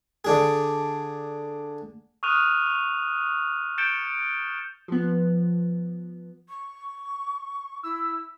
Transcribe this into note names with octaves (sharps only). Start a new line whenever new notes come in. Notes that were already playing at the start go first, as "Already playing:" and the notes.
D3 D4 G#4
C#6 D#6 F6 F#6 D#7 F7
G6 A6 C#7 D7 E7 G7
F3 B3
C#6
E4 E6